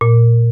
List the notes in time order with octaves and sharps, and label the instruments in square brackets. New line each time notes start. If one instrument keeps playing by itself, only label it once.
[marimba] A#2